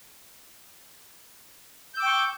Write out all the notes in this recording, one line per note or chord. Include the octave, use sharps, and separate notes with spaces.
G5 C#6 D6 E6 G6